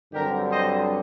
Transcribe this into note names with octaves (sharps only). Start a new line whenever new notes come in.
G2 D3 F#3 C4 G4 A#4
C5 D#5